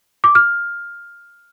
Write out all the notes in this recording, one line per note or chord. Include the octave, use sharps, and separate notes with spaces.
D6
F6